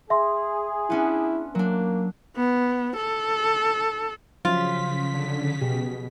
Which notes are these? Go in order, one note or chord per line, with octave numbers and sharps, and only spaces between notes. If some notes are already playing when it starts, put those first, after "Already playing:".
G#4 E5 C6
B3 C#4 D4 E4
F#3 A#3 D4
B3
A4
C#3 F3 F#3 C#4 F4 B6
D3
B2 G4 G#4